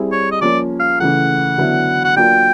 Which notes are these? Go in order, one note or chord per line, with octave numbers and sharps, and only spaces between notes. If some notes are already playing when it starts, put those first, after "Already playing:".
Already playing: G3 C4 E4 G#4
C#5
D#5
F3 A#3 C#4 D5
F5
C#3 E3 A3 F#5
D3 F#3 B3 E4
F#5
F#3 A#3 D4 F4 G5